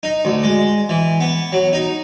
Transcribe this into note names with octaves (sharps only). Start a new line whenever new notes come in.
D#4
D2
G#3
E3
B3
F#3
D#4